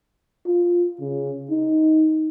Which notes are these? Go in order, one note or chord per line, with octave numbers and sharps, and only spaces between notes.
F4
C#3
D#4